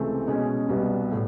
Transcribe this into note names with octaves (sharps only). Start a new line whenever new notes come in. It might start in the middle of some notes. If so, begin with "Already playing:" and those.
Already playing: C#2 C3 E3 A3 C4
B2 G#3 C#4
C2 B2 G3 B3
A2